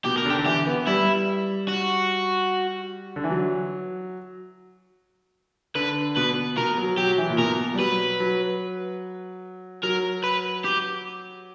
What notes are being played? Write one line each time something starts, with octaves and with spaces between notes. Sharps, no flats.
B2 G4
A#4
D3
G4
D3
E3 G4
B3
G3 E4
F#4
D3
E3
F#3
D3 B4
B2 B4
B2 A#4
F#3
F#3 G4
E3
A#2
B2 A#4
G3
F#3 B4
F#3
F#3 A#4
B4
G4